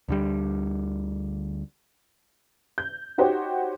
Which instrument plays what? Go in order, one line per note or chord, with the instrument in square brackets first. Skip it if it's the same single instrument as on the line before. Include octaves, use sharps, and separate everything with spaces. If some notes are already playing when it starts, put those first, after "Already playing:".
[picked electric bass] D2 D3 G3
[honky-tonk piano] G6
D#4 F#4 G4 C5 C#5 G5